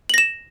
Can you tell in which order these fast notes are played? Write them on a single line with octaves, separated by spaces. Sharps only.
F#7 A#6 E7